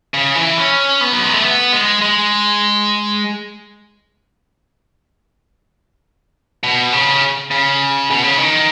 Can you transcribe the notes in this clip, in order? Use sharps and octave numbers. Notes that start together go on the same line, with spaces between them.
C#3
E3
C#4
B3
F#3
G#3
A3
B3
G#3
G#3
B2
C#3
C#3
B2
C#3
D#3